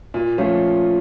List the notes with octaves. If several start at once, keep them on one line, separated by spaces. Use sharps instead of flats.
A#2
F3 A3 C#4 F4